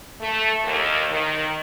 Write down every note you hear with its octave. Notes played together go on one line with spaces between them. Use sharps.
A3
D#2
D#3